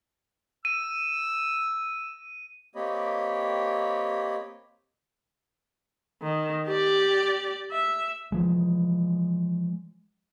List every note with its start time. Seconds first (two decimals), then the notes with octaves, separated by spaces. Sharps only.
0.65 E6 D#7
2.75 A#3 C4 G4 C#5 D#5 B5
6.22 D#3
6.68 G4 D5
7.72 E5
8.32 E3 F3 G#3